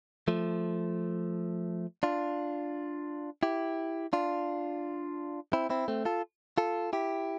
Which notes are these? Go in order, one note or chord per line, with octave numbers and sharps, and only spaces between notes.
F3 A3
D4 F4
E4 G4
D4 F4
C4 E4
C4 E4
A3 C4
F4 A4
F4 A4
E4 G4